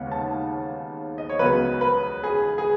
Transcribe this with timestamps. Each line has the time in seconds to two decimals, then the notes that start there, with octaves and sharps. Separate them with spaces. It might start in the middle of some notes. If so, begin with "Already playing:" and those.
Already playing: D#2 C#3 G#3 B3 F#5
0.11 A5
1.18 D#5
1.29 C#5
1.39 C#2 C#3 F#3 B3 B4
1.81 B4
2.24 G#4
2.58 G#4